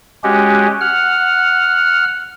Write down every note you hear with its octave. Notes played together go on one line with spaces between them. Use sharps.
G#3 C#4 F#4 G4
F#5 F6